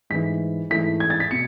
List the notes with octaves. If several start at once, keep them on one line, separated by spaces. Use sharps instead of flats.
G#2 E3 A3 E4 B6
G#2 E3 A3 E4 B6
G#6
A6
B6
B2 C#7